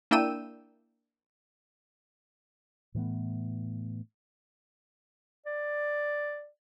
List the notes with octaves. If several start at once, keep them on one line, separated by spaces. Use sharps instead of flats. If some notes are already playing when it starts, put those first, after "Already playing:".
A#3 D4 E4 G5 E6 D#7
A2 E3 A3 B3
D5